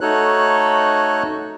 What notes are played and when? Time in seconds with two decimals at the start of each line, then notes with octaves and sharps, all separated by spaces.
0.01 A3 D#4 F#4 A4 C#5 F#6